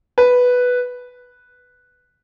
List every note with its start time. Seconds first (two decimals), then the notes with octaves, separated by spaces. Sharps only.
0.18 B4